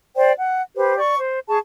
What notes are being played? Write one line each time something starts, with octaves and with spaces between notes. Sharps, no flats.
C5 D5 G5
F#5
G4 B4 C5
D5 C#6
C5
G#4 A5 C#6